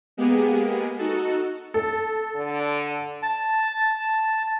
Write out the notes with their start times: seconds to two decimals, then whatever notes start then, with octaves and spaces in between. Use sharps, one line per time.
0.17 G#3 A#3 B3 G4 G#4
0.98 D#4 F#4 A4
1.74 A4
2.36 D3
3.22 A5